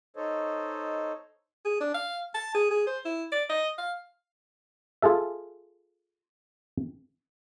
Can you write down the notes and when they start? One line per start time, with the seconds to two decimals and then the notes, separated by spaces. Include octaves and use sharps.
0.16 D#4 A4 C5 C#5 D#5
1.65 G#4
1.80 D4
1.94 F5
2.34 A5
2.54 G#4
2.71 G#4
2.87 C5
3.05 E4
3.32 D5
3.50 D#5
3.78 F5
5.02 F4 G#4 A4 E5